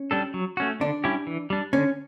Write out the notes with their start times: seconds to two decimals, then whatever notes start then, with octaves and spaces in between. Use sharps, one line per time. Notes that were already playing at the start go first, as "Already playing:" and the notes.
Already playing: C#4
0.11 G3 D4 A4
0.34 F#3
0.57 A3 C#4 F#4
0.80 D3 D4
1.04 G3 C#4 E4 G4
1.27 E3
1.50 G3 D4
1.73 D3 C#4